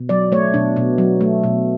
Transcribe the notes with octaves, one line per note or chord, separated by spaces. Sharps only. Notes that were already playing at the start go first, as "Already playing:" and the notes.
Already playing: B2
F#3 D5
A3 C#5
B2 D4
B2
F#3
A3
B2